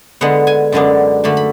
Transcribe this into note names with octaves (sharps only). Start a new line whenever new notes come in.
D3 G#3 B3 F#5
G#5
F#2 D3 G#3 B3 D4
D3 A3 D4 B5
B5